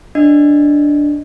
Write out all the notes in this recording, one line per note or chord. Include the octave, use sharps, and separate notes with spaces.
D4 D#5